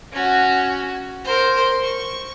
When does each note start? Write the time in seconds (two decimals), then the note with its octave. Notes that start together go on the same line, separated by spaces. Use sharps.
0.12 C#4 F#4
1.24 A#4 C5
1.82 C#6